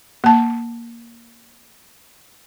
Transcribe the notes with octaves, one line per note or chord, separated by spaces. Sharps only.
A#3 A5